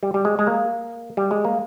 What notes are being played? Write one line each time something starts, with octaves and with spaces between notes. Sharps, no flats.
G3
G3
G#3
G#3
A#3
G3
G#3
A#3